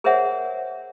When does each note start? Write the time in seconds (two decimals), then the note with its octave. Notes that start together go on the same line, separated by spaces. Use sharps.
0.04 G#4 A#4 C5 C#5 E5 F#5